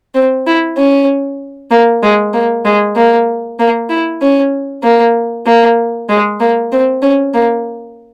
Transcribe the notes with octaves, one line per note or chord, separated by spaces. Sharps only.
C4
E4
C#4
A#3
G#3
A#3
G#3
A#3
A#3
E4
C#4
A#3
A#3
G#3
A#3
C4
C#4
A#3